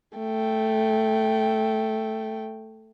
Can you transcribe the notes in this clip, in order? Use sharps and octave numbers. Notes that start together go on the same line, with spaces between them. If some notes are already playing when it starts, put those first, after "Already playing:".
A3 G5